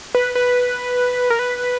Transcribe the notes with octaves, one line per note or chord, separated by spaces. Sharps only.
B4
B4
A#4
B4